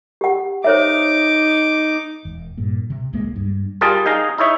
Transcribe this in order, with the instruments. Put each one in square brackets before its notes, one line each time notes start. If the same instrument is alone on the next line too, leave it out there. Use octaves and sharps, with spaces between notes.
[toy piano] G4 F#5
[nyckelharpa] D#4 D6 [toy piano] C5 C#5 E5
[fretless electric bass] E1
G2 A#2
C3
D1 C#2 G#3 A#3
G2
[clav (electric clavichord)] G3 F4 G#4 A#4 A5
D#4 G#4 F5 A#5
D#4 E4 C#5 E5